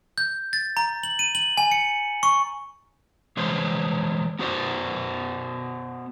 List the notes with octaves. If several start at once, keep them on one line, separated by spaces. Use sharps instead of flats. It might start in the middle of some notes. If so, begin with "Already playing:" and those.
G6
A6
A#5
F#7
D#7
F#7
G#5
C#7
C#6
E3 G#3 C5 C#5
B3 F#4 C5 D5